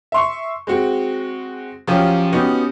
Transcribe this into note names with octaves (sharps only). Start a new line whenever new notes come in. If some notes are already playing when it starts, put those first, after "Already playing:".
E5 C6 C#6
G#3 C4 F#4
F3 F#3 C#4 F4 G4 C#5
B3 C#4 D#4 F#4 G4